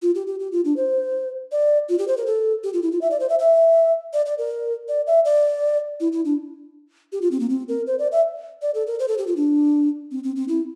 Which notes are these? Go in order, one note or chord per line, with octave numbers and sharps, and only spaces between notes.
F4
G4
G4
G4
F4
D4
C5
D5
F4
G4
C5
A#4
A4
G4
F4
E4
F4
E5
D5
C5
E5
E5
D5
D5
A#4
D5
E5
D5
E4
E4
D4
G4
F4
C4
A#3
C4
A#4
C5
D5
E5
D5
A4
A#4
C5
A4
G4
F4
D4
C4
C4
C4
E4